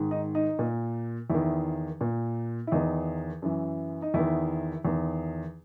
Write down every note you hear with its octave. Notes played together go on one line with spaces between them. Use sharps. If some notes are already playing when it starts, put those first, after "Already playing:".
Already playing: G#2 D#3
D#4
D#4
A#2
E2 D#3 E4
A#2
E4
E2 D#3 D#4
F#2 E3
D#4
E2 D#3 E4
E2 D#3